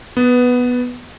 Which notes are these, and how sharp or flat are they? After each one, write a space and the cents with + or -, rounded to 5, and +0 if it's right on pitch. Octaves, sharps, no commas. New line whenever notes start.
B3 +0 B4 +5